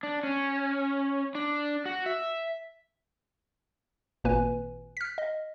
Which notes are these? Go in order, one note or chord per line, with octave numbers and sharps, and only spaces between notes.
D4
C#4
D4
F#4
E5
G#1 A#2 A#3 B4 G#5
F6 B6
D#5